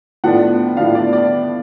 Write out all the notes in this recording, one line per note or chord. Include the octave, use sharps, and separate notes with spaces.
A2 F3 B3 D4 F#5
A2 F3 B3 D4 F5
D5
D5